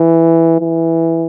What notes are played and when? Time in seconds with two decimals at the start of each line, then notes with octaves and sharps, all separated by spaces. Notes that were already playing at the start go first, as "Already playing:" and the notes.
Already playing: E3
0.60 E3